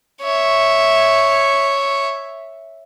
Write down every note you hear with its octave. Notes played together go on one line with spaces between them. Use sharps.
C#5 E5